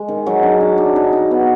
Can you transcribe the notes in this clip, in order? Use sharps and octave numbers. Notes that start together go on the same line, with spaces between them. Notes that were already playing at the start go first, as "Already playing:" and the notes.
Already playing: G#3
D#3
F#3
D4
D4
D4
D#4
D#4
B3